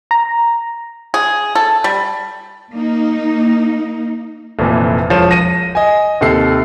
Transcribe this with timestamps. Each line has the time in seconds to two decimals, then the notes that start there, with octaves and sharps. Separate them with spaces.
0.11 A#5
1.14 G#4
1.55 A4
1.84 G3
2.74 A#3 D#4
4.59 F1 F2 A#2 E3
5.10 E1 F3 C#5 E7
5.31 A#6 D#7
5.75 D#5 G#5
6.21 D#2 C3 A4 C7